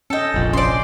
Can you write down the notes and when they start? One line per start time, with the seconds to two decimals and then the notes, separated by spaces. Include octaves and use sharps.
0.10 C#4 A4 D#5 G5
0.34 F1 A#1
0.53 C#4 C5 D5 C6